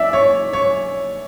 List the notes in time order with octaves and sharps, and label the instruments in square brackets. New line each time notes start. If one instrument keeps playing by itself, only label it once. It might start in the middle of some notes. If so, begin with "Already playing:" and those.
Already playing: [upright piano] D5 E5
C#5
C#5